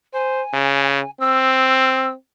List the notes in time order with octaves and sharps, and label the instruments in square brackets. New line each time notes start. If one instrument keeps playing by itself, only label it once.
[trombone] C5 [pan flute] G#5
[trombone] C#3
[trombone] C4 [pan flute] E6